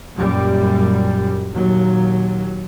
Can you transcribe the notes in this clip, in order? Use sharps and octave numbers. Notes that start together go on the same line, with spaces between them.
F#2 A#2 G3
D#2 A#2 F#3